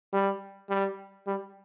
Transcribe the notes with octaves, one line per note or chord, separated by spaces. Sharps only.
G3
G3
G3